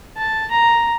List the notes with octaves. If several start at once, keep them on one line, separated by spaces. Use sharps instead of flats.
A5
A#5